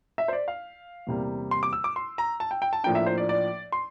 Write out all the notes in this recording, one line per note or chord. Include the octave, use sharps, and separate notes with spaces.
E5
C5
D5
F5
E2 C3 G3 A#3
C6
D6
E6
D6
C6
A#5
A5
G5
G5
A5
A2 F3 A#3 D4 G5
E5
C5
D5
D5
C6